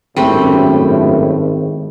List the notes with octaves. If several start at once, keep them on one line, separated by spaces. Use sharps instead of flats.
G#1 F#2 A2 G3 A3 C4